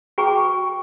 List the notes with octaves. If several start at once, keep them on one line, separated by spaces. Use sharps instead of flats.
F#4 G#4 B4 G5 A#5 C#6